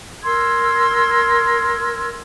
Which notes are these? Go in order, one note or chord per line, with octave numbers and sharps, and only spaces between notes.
A#4 C6 E6 G#6